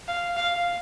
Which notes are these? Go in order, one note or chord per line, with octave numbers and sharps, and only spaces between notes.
F5
F5